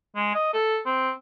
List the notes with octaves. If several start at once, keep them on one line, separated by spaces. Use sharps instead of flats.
G#3
D#5
A4
C4